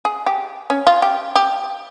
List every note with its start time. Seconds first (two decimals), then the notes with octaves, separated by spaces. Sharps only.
0.05 G#4
0.26 G4
0.70 C#4
0.87 F4
1.02 G4
1.35 G4